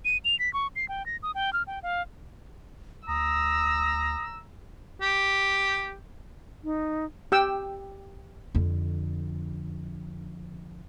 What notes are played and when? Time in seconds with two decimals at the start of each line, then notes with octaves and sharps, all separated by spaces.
0.05 D#7
0.25 F7
0.39 B6
0.53 C#6
0.76 C7
0.89 G5
1.06 A#6
1.23 D#6
1.35 G5
1.53 F6
1.67 G5
1.83 F5
3.08 D2 A#5 D#6 E6
5.01 G4
6.64 D#4
7.32 G4 G5 E6
8.55 F2 D3